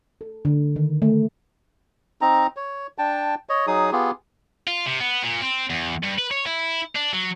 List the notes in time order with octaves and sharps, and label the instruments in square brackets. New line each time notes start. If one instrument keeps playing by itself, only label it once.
[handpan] A4
D3
D#3
A3
[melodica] C4 D#4 A#5
C#5
D4 G5 A5
C#5 D#5
F#3 D#4 G#4 D#6
B3 F4 G4 G#4
[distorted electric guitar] F4
C3
B3
A#2
C4
E2
G2
B4
C#5
E4
D4
F#3